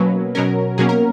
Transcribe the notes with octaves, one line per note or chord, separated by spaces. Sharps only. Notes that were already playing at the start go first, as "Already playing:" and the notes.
Already playing: B2 F#3 A#3 C#4 B4
B2 F#3 C#4 A#4
B2 F#3 A#3 C#4 G#4
A#4